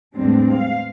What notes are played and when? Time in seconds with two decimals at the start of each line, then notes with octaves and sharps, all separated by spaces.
0.16 E2 A2 G3 G#3 C4 D4
0.54 F5